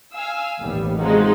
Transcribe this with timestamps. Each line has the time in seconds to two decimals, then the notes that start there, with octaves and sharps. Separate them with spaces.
0.13 F5 G#5 E6
0.62 A1 D#2 G3 B3
0.98 C3 F3 G#3 D#4 F4 F#4